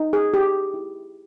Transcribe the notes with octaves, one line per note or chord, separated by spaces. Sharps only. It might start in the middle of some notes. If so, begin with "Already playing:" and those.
Already playing: D#4
G#4
G4
E4